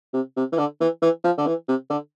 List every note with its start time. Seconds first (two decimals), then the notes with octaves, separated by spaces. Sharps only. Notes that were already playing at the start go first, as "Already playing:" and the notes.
0.14 C3
0.37 C3
0.52 E3
0.58 D3
0.81 E3
1.02 E3
1.24 F3
1.38 D3
1.46 E3
1.68 C3
1.90 D3